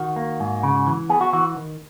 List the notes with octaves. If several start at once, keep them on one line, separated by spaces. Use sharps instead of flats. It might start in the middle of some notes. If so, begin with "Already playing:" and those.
Already playing: D#3 F#4
A#3
G#2
C#3
E3
B3 G#4
F#4
E3 F#4
D#3